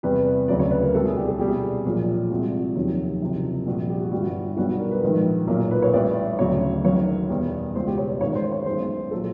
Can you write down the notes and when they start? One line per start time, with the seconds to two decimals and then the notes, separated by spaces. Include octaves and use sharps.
0.03 E2 C3 E3 G3 B4
0.48 D2 C#3 F#3 D5
0.60 C#5
0.71 B4
0.83 A#4
0.93 C2 B2 G3 A4
1.05 G#4
1.17 G4
1.28 A4
1.39 C2 B2 G3 G4
1.48 G#4
1.56 G4
1.85 A#1 A#2 F#3
2.30 C2 C3 F3 G#3 F#4
2.76 F1 D#2 D#3 F#3
3.22 F#1 F2 C3
3.66 A#1 A#2 G3 F#4
3.90 G4
4.00 F#4
4.11 G1 G2 E3 G3 F#4
4.57 B1 B2 G3 F#4
4.69 F#4
4.79 A#4
4.91 B4
5.03 A#1 G#2 D#3 G3
5.48 B1 A#2 F#3 A#4
5.60 A#4
5.71 B4
5.82 C#5
5.93 A1 A2 E3 G3 D5
6.39 D2 C#3 F#3 C#5
6.84 G#1 F#2 D#3 F#3 C#5
7.29 E2 B2 G3
7.75 C#2 B2 G3 C5
7.87 G4
7.98 C#5
8.09 D5
8.21 A1 G#2 D#3 C#5
8.35 C5
8.51 C#5
8.66 B1 B2 G#3 C5
9.11 A#2 F#3 A4